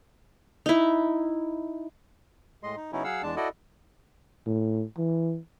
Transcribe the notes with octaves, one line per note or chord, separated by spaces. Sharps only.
D#4 E4
A2 G#3 D#5 C6
D#4
C#3 F#3 B3 C#4 D#4 E4
F#3 G#4 F5 F#5 E6
E2 G#3 D4 A5
E4 F#4 A4 D5 D#5
A2
E3